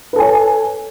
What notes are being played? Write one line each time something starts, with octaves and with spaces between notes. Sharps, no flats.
A4 B4 C#5 G#5